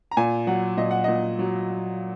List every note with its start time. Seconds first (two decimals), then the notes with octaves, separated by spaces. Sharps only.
0.11 A#5
0.17 A#2 G#5
0.47 F#3 F#5
0.77 A#2 D#5
0.91 F#5
1.04 A#2 D#5
1.39 F#3